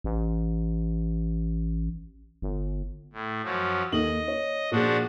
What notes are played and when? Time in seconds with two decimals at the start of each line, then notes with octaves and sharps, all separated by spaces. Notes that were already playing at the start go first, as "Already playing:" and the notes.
0.04 A1
2.42 G1
3.13 A2
3.43 F#2 F3 F#3
3.92 D#2 A4 D#5 F#7
4.28 C#5
4.71 A#2 F3 D4 F#4 G#4